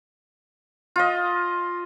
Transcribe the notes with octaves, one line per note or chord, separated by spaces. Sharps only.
F4 D#5